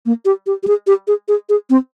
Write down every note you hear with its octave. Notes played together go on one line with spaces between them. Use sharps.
A#3
G4
G4
G4
G#4
G4
G#4
G#4
G#4
C4